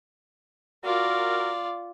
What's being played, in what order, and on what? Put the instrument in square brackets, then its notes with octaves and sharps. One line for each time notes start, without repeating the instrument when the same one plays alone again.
[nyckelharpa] F4 D5 [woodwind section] F#4 A#4